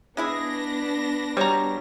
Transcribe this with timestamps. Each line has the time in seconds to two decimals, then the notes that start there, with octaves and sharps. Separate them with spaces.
0.17 G#3 B3 D4 E4 G#4 A#6
1.37 G3 F#4 C#5 A#5